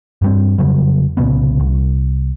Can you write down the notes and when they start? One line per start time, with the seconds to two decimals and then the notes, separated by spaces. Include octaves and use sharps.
0.22 G2 G3 C4
0.58 F2 C#3 F#3 G3
1.17 C2 A#2 C#3 B3
1.60 C2